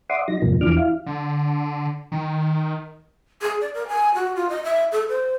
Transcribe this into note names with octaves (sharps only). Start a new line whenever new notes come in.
D5 E5 F#5 C6 D6 D#6
F#3 D#4 A#6
F2 G#2 C3 F3 A#3
E2 E3 F3 D4 D6 F6
E4 F5
D3
D#3
G#4
D5
A#4
G#5
F#4
F4
D#5
E5
A4
C5